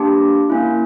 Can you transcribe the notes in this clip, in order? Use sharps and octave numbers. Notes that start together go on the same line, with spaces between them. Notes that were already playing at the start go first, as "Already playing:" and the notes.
Already playing: A#3 D4 G4 C6
A#3 C#4 E4